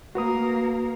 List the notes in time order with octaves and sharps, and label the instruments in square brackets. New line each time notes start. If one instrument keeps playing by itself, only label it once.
[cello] A#3 A#4 [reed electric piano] F#4 B4 D#6